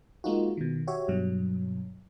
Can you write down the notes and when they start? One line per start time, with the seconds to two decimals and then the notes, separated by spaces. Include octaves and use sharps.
0.24 G#3 A#3 D#4 F4 F#4
0.57 B2 D#3
0.87 F#4 G4 C#5 E5
1.08 G2 B2 F#3